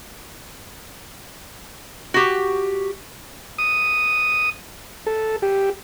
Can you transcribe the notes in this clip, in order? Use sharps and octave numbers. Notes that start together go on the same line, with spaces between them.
F#4 G4
D#6
A4
G4